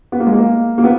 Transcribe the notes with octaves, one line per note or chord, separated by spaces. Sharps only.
B3
A#3
G#3
A#3
A#3
B3